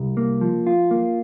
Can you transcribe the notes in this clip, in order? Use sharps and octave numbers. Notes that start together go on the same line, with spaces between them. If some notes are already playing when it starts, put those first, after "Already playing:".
Already playing: C2
A#3
F3
F4
A#3